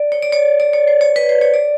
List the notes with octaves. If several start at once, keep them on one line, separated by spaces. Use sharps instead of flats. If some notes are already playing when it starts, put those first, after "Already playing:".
Already playing: D5
C#5
D5
C#5
D5
C#5
C5
C#5
B4
C5
C#5
D5